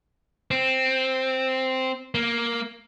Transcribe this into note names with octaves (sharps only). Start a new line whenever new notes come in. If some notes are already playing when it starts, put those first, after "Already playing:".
C4
A#3